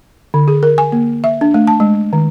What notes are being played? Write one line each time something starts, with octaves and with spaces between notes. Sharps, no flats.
D3
G#4
A#4
G#5
A#3
E5
D4
A3
A5
G#3
D#3